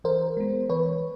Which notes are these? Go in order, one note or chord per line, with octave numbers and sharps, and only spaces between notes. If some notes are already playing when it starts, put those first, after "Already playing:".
E3 A#4 C5
G#3 B3
E3 B4 C#5